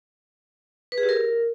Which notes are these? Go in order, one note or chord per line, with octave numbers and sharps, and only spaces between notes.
B4
G#4
G4
A#4